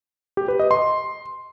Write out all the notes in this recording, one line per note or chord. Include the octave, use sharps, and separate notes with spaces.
G4
B4
D#5
C6